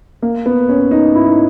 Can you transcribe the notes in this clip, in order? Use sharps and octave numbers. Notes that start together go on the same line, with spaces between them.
A#3
B3
C#4
D#4
E4
D#4